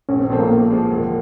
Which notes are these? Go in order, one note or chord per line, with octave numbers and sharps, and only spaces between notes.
A#1 C#4
C4
A#2 F3 A3 B3 C4
A#3
A2
F3 G#3
E1